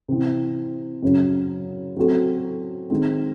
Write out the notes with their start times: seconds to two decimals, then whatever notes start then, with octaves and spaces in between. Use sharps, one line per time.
0.08 C3 E3 C4
1.03 F#2 C#3 F#3
1.96 F#3 A3 C4 F#4 A4
2.90 D#3 G#3 C4